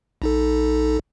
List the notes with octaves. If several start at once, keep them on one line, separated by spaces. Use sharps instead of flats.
A#1 D#4 A4